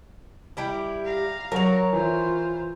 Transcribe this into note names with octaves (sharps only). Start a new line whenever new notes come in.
G3 E4 G4
F5 A#5
F#3 F#4 A#4 C#5 F7
E3 F4 C5